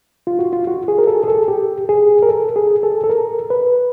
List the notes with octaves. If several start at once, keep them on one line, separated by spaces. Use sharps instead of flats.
F4
F#4
F4
F#4
G#4
A#4
A4
G#4
A4
G4
G#4
A#4
A4
G#4
A4
A4
A#4
B4